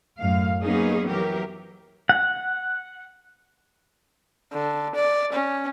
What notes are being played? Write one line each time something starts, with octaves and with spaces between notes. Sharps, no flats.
F#2 A2 F5
F#3 A#3 B3 C#4 D#4 G#4
E3 F#3 G4 A#4
F#5
D3
D5
C#4